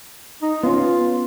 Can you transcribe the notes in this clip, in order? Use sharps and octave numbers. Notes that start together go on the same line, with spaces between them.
D#4
B3 C#4 F4